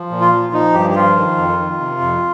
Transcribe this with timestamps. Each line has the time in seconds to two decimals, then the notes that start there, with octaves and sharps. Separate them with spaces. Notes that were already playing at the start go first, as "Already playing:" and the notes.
Already playing: F3
0.11 A#2
0.21 F4
0.32 F3
0.53 F3 D#4
0.74 G2 G4
0.90 G4
0.95 F3 F4
1.17 D#3
1.38 F2
1.59 D#3
1.80 C3
2.01 F2